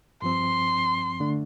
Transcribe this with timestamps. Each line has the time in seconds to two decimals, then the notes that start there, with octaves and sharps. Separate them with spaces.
0.22 G2 F3 C4 C6
1.20 D3 A3 D4